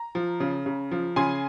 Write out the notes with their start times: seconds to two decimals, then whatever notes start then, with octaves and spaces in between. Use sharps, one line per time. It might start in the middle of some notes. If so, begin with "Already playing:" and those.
Already playing: A#5
0.15 F3
0.40 C#3
0.66 C#3
0.91 F3
1.16 C#3 G#5 C6